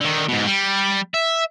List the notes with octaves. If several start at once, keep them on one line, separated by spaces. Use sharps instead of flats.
D3 D#3
G#2 B2
G3
E5